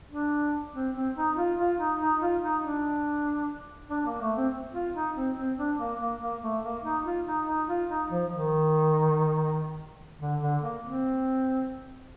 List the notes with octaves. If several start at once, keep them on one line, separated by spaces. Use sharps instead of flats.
D4
C4
C4
D#4
F4
F4
D#4
D#4
F4
D#4
D4
D4
A#3
A3
C4
F4
D#4
C4
C4
D4
A#3
A#3
A#3
A3
A#3
D#4
F4
D#4
D#4
F4
D#4
F3
D#3
D3
D3
A#3
C4